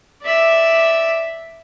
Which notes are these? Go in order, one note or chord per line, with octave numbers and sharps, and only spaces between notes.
D5 E5